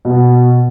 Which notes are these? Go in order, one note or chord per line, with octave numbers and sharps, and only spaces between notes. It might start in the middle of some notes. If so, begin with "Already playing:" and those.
B2